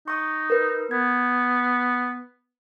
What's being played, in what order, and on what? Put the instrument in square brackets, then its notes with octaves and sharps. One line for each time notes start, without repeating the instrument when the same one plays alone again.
[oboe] D#4 [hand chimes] C#6 D#6
[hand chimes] A#4 B4
[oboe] B3 [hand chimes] G#6